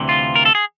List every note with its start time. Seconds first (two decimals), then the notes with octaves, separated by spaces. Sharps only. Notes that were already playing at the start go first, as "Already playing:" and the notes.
Already playing: D2 C3 E3
0.09 F4
0.36 A#4
0.45 A4
0.55 G#4